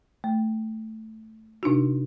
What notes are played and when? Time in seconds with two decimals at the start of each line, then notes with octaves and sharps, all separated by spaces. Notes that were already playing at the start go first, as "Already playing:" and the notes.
0.24 A3
1.63 C3 D4 D#4 F#4